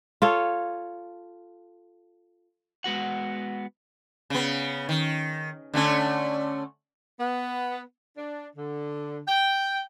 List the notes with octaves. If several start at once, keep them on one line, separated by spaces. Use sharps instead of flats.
F4 A4 C#5
G#3 B3 F#4 F#5
C#3 B3
D#3
D3 A3 C#4
B3
D4
D3
G5